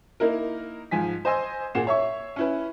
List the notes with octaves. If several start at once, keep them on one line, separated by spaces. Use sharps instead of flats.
A#3 D#4 E4 A#4
G#2 F3 G#5 B6
C5 D#5 G#5 C6 E6
A#2 G#4 F#5 C7 E7
C#5 E5 C#6
C#4 E4 B4